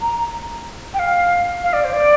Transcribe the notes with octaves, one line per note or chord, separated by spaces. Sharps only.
A#5
G5
F5
F5
D5
C5
D5